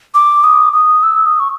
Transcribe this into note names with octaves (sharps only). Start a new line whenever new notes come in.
D6
D#6
D#6
E6
D#6
C#6